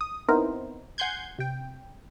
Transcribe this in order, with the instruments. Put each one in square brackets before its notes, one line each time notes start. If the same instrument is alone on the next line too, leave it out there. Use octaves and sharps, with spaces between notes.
[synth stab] D#6
B3 C4 D#4 E4 A#4 C5
F#5 G#5 C6 G6 G#6
C3 G5